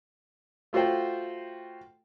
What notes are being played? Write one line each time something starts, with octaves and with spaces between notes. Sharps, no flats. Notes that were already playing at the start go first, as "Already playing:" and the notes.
A3 F4 F#4 C5 G5